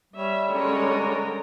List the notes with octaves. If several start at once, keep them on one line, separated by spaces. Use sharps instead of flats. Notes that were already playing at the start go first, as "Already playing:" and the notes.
G3 C#5 E5
D3 G#3 C#4 A#4 C#5